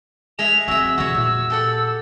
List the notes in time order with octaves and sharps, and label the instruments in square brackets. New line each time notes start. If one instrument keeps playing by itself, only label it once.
[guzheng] G#3 E5 [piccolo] F7
[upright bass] F3 C4 [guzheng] F#4 E5 [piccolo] E6
[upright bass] E2 C3 [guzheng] F#4 C#5
[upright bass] A#2
[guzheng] G4 A4 F#5